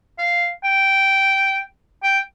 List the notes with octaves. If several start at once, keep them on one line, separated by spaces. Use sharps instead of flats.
F5
G5
G5